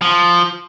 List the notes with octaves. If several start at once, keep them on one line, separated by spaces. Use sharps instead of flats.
F3